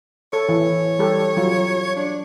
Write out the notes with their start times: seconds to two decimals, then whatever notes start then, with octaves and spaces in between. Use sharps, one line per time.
0.33 A4 C#5
0.49 E3
0.99 G3 G4 A4
1.37 F#3 F4
1.96 D4